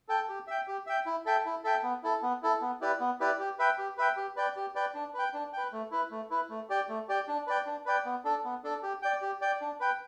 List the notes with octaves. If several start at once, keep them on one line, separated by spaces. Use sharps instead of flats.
A4 G5
G4
E5 G5
G4
E5 G5
E4
A4 E5 G5
E4
A4 E5 G5
B3
E4 A4
B3
E4 A4
B3
E4 G4 B4 D5
B3
E4 G4 B4 D5
G4
B4 E5 G5
G4
B4 E5 G5
G4
B4 D5 G5
G4
B4 D5 G5
D4
B4 G5
D4
B4 G5
A3
E4 B4
A3
E4 B4
A3
G4 D5 G5
A3
G4 D5 G5
D4
B4 D5 G5
D4
B4 D5 G5
B3
D4 A4
B3
D4 A4
G4
D5 G5
G4
D5 G5
D4
B4 G5